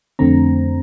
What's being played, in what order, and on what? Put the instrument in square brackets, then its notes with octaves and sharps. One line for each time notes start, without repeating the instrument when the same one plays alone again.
[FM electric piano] F2 D3 A3 C4 A#5